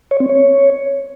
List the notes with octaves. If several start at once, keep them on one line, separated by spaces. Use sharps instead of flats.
C#5
C4
C#5